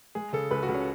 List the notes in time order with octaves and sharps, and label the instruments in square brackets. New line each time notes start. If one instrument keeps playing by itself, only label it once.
[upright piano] G#3 [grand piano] G#4
[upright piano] C#3 [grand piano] A4
[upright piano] C#2 [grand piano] B4
[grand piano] F#4
[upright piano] C#2
[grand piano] C#4